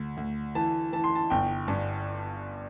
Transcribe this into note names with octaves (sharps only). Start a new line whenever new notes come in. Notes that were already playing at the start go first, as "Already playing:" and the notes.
Already playing: D2
D2
E3 A5
E3 A5
C6
A5
G1 G5
G2